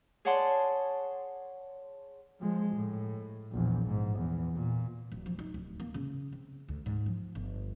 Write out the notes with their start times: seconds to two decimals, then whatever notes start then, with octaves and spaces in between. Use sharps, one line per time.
0.25 G#4 C#5 D5 F#5 A5 C6
2.40 F3 G#3
2.74 A2
3.53 A#1 E2
3.85 G#2
4.18 E2
4.54 A#2
5.12 D1
5.26 F3
5.39 D#4
5.54 D1
5.80 A#3
5.94 C#3
6.33 C4
6.69 D2
6.86 G#2
7.06 F3
7.35 G1